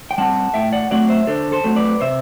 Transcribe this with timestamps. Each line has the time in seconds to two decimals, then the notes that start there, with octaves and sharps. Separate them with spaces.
0.11 G5
0.18 G3 C4 F#5 A5
0.54 A2 E5 G5
0.73 D5 F#5
0.91 F#3 A3 C4 D5 F#5
1.09 C5 E5
1.27 D3 A4 C5
1.52 A4 C5
1.64 F#3 A3 C4
1.76 B4 D5
2.00 C3 C5 E5